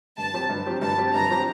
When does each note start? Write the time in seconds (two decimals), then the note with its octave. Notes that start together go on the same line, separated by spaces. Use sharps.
0.18 G2 A5
0.33 F#3 C4 G4
0.49 G2
0.66 F#3 C4 G4
0.81 G2 A5
0.98 F#3 C4 G4
1.14 G2 A#5
1.30 F#3 C4 G4